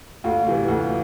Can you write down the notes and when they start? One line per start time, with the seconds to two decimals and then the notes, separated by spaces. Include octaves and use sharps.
0.24 D2 F4
0.46 C3 E3
0.68 D2